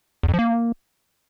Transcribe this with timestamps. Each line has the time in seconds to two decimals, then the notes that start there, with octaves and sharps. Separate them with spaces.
0.23 E2
0.28 F2
0.34 F3
0.39 A#3